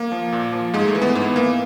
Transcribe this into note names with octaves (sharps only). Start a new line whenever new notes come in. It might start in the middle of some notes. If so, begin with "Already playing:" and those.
Already playing: A#3
F3
A#2
F3
G#2 G#3
A3
E3
B3
G#2 B3
E3 A#3